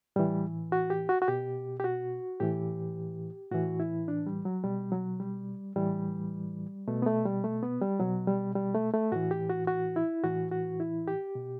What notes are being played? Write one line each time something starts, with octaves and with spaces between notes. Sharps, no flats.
A2 E3 G3
F#4
G4
F#4
F#4
B2 G4
G4
F#4
A2 E3 G4
A2 E3 F#4
E4
D4
G3
F#3
B2 G3
F#3
G3
A2 E3 G3
B2 A3
B3
A3
G3
A3
B3
G3
B2 F#3
G3
G3
A3
A3
A2 E3 F#4
G4
F#4
F#4
E4
A2 E3 F#4
F#4
E4
G4
B2